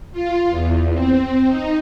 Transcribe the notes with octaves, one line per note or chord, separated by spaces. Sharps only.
F4
E2
C4
D#4